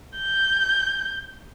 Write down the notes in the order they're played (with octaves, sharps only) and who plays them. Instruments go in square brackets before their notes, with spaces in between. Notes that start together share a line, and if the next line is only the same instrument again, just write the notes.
[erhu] G6